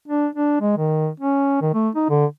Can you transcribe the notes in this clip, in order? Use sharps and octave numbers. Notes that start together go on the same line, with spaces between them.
D4
D4
G#3
D#3
C#4
D#3
A3
D#4
D3